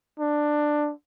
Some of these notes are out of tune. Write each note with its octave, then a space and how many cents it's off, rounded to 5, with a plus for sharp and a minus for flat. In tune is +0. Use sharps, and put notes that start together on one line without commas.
D4 +10